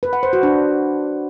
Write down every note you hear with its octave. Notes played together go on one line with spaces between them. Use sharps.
B4
F#5
C5
F#4
D4